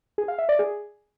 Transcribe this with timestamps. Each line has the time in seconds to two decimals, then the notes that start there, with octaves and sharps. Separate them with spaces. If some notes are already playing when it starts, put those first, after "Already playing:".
0.18 G#4
0.28 F5
0.38 E5
0.49 D5
0.59 G#4